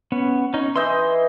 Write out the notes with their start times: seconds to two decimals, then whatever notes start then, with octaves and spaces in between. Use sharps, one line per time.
0.12 B3 C#4
0.54 C#4 D#4
0.76 E3 D#5 C6 E6 G6